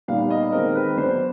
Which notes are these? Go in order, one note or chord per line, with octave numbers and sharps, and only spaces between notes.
A#2 G3 B3 D#4 F5
D#5
D#3 G#3 C4 A#4
B4
F#3 B3 D4 C5